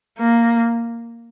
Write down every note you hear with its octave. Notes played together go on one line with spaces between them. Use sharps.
A#3